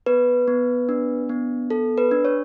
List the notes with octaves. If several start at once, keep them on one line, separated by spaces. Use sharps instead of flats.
B3 B4
B3
D4
B3
A4
B4
D4
C#5